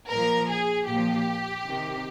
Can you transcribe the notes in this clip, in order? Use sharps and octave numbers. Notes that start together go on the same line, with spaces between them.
A#2 F3 A#4
G#4
A#2 F3 G4
C3 D#3